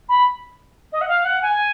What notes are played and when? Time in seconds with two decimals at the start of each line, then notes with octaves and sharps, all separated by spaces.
0.09 B5
0.92 D#5
1.01 F#5
1.08 F5
1.25 F#5
1.42 G#5